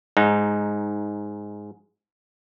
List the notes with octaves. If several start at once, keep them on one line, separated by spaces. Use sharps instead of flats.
G#2 D#4